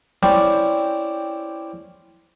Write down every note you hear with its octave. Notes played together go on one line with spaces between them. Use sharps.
C4 C#4 E4 G4 D5 C#6